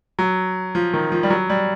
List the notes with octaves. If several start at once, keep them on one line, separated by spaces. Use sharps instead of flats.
F#3
F3
D#3
F3
G3
F#3
G3